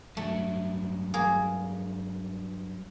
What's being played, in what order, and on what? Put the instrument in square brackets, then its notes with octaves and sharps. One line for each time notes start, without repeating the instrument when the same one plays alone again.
[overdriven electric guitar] G2 F#3 [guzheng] A3
[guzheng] A#3 G#4